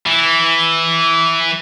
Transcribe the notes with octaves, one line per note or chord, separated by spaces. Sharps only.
E3